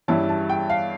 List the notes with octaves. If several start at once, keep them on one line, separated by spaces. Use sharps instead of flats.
G2 E3 G3 C#4 E4 A5
A5
G5
F5